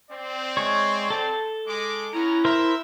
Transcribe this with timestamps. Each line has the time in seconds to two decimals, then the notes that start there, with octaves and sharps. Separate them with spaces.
0.10 C4 D5
0.57 G#3 C#5
1.10 A4 A5
1.67 G#3 D6
2.13 B3 C#4 E4 A#5
2.45 A#4 C5 E5